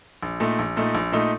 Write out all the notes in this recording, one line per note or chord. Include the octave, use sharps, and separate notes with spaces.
A#1
A#2 A3 D#4
A#1
A#2 A3 D#4
A#1
A#2 A3 D#4